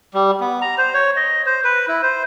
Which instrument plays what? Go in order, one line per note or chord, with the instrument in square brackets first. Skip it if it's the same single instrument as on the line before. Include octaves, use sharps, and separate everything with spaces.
[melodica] G3
B3
A#5
C5
C#5
D#5
C5
B4
E4
C5